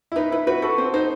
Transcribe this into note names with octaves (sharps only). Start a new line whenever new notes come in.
E4
D#4 B4
E4 B4
F#4 B4
F#4 A4
C4 C5
D#4 C5